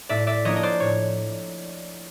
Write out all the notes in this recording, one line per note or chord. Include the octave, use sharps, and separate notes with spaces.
A2 D5 E5
D5 E5
F3 A#3 D4 C#5 D#5
D#5
C5 D5
A2 C#5